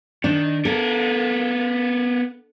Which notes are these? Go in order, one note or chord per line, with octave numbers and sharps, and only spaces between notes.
D#3 D4
B3 A4 A#4